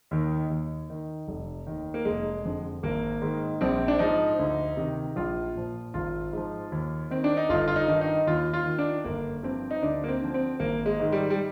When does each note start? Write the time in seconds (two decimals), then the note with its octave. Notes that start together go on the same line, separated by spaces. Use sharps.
0.11 D#2 D#3
0.50 D#2
0.90 D#3
1.28 F1
1.67 D#2 D#3
1.94 A#3
2.05 F1 G#3
2.45 F2 D3
2.83 G#1 A#3
3.22 G#2 D#3
3.61 A#1 C4
3.88 D4
3.99 G#2 F3 D#4
4.39 D2
4.77 C3 D#3
5.16 A#1 F4
5.55 A#2 F3
5.94 G#1 F4
6.33 G#2 F3
6.72 D#2
7.10 D#3 C4
7.24 D4
7.37 D#4
7.49 G1 F4
7.68 F4
7.76 D#4
7.88 G2 D#3
8.01 D#4
8.27 D#2 F4
8.54 F4
8.66 D#3
8.79 D4
9.04 G1 A#3
9.43 G2 F3 C4
9.71 D#4
9.82 D2 D4
10.04 A#3
10.08 C4
10.22 D3 F3
10.34 C4
10.60 G#1 A#3
10.86 G#3
10.99 G#2 D#3
11.12 G3
11.30 G3